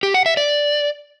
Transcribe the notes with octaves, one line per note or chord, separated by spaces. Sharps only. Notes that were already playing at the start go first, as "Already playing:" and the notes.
G4
F#5
E5
D5